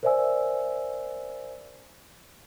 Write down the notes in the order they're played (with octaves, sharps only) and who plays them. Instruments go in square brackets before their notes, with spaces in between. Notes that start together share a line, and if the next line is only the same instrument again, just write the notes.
[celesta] A#4 C5 D5 E5 G#5 E6